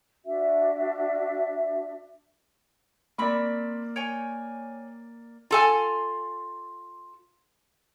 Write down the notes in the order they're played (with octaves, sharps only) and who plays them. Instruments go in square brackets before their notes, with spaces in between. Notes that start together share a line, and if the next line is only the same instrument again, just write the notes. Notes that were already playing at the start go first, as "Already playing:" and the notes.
[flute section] D4 F#4 E5
[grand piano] A#3 D5 [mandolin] C4 B5 C#6
[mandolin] C#5 G5 G#5
[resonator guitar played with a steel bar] F4 A4 G#5